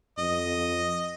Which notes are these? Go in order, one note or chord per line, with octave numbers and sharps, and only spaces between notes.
F2 D#5